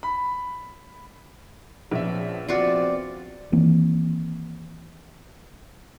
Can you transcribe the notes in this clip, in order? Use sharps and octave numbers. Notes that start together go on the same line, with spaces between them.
B5
A#1 F3 B3 C#4 E5
C3 B3 C4 F4 F#4 D5
D#3 E3 A#3 C4